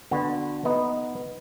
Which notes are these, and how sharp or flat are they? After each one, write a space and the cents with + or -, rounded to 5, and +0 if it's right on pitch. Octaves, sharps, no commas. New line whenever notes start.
D3 +10 B3 +0 F#4 -20
B3 +0 D#4 +0 D#5 +0